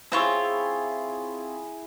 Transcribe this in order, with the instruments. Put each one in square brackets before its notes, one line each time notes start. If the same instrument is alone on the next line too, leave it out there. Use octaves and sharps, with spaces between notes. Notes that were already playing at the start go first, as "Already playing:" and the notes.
[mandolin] C4 F4 C#5 [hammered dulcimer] E4 G#4